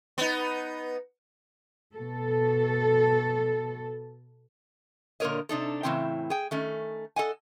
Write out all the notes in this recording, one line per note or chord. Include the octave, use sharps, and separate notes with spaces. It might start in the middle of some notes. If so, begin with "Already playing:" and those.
B3 D#4
B2 A4
A#2 D3 A#3 A#4 C#5 D#5
C3 D4 D#4 A4
A2 C#3 E3 C4 E4 G5
G#4 G5
D#3 A3 C#4
A4 D#5 F#5 G#5